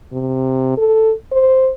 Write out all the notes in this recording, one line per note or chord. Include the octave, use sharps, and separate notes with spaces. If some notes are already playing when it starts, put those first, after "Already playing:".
C3
A4
C5